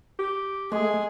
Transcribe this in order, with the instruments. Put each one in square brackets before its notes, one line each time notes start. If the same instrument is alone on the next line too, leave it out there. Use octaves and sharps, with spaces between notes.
[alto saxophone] G4
[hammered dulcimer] G#3 [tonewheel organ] A3 [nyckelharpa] G#4